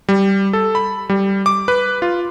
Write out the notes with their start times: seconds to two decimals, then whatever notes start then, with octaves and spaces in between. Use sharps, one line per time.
0.09 G3
0.53 A4
0.75 B5
1.09 G3
1.46 D6
1.68 B4
2.02 F4